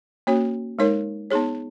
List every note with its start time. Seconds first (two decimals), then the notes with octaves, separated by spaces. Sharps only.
0.27 A#3 C#4 F#4 C#5
0.79 G#3 D#4 A#4 C#5
1.31 B3 D#4 G#4 C#5